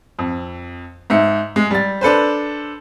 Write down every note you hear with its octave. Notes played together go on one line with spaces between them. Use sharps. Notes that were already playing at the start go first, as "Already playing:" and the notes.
F2
G#2 E5 C#7
G#3
G3 A6
D4 A4 B4 C5